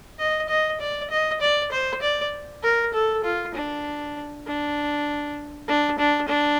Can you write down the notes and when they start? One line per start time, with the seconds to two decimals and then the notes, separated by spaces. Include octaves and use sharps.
0.19 D#5
0.49 D#5
0.80 D5
1.10 D#5
1.41 D5
1.72 C5
2.02 D5
2.63 A#4
2.93 A4
3.24 F4
3.54 D4
4.46 D4
5.68 D4
5.98 D4
6.28 D4